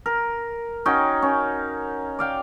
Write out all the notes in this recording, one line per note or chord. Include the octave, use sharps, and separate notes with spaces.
A#4
C#4 D#4 F#4 G5
C#4
D5 F5 G5